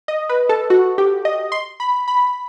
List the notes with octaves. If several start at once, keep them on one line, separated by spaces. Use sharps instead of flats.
D#5
B4
A4
F#4
G4
D#5
C6
B5
B5